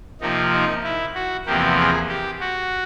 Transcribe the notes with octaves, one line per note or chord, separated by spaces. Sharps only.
C3 F3 A#3 D#4
D#4
E4
F#4
E2 C3 F3 A#3 G4
G#4
G4
F#4